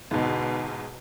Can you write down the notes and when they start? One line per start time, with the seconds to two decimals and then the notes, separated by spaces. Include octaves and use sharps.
0.11 E2 G#2 B2 D3 D#4